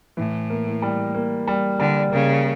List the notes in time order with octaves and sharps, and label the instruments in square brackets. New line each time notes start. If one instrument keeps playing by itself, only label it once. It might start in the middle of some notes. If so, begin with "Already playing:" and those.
[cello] A2 [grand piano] E3
[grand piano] A#3
G3
A#3
G3
[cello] D3 [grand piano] G3
[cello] C#3 [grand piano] A#3